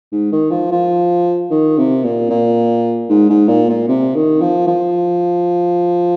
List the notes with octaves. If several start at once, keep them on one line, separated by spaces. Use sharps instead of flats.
G#2
D#3
F3
F3
D#3
C3
A#2
A#2
G#2
G#2
A#2
A#2
C3
D#3
F3
F3